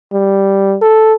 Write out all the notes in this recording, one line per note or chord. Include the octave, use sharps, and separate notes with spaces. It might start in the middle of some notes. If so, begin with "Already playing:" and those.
G3
A4